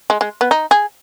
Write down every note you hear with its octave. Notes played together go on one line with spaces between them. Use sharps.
G#3
G#3
B3
D#4
G#4